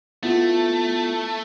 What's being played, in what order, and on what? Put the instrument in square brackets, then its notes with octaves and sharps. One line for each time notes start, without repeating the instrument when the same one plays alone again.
[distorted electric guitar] A3 [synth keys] B3 E4 F4